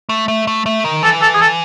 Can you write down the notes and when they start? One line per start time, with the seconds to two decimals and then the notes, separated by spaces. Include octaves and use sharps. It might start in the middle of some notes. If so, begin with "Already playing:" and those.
0.09 A3
0.28 A3
0.47 A3
0.66 A3
0.85 D#3
1.03 E3 A4
1.22 A4
1.35 G#4
1.41 A4